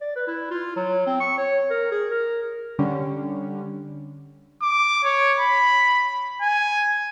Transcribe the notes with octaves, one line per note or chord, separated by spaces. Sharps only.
D5
B4
E4
F4
F#3
C4
C#6
C#5
A#4
G#4
A#4
D3 G3 C#4
D6
C#5
B5
G#5